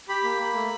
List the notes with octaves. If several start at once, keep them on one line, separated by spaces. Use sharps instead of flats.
G4 B5
A#3
A#3
A3